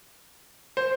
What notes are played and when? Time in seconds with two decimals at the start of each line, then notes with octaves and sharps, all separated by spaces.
0.77 C5